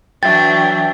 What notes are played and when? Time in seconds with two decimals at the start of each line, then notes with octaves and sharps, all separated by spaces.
0.23 E3 F#3 D4 E5 G5 A6